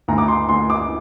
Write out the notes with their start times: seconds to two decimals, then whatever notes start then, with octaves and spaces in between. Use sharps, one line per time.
0.08 D2 A#5
0.18 D6
0.28 C6
0.49 D2 C6
0.70 D6